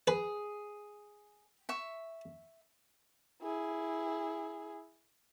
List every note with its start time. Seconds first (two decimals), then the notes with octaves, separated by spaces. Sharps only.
0.07 G#4 B4
1.69 E5 C#6
3.42 E4 G#4